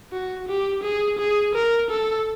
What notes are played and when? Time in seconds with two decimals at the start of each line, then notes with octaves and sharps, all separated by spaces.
0.12 F#4
0.48 G4
0.83 G#4
1.19 G#4
1.55 A#4
1.90 A4